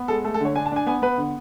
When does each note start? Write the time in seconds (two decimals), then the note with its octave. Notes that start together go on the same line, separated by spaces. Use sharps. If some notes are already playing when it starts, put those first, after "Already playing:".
Already playing: B3
0.08 G#3 A4
0.24 A3 A4
0.34 A4
0.40 D3 C#5
0.56 D4 G#5
0.66 A5
0.72 D4 G#5
0.87 B3 G#5
1.02 B3 B4
1.17 D3